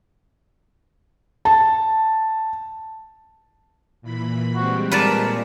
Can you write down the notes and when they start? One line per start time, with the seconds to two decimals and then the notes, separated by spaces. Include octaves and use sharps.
1.45 A5
4.02 A#2 E3 B5
4.55 G3 G#3 C4 F#4
4.91 A#2 A#4 B4 D5 A5